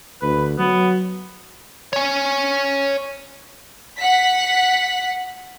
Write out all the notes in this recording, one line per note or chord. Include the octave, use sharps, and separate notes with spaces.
D2 B4
F#3 B3
C#5 G#5
F#5 B6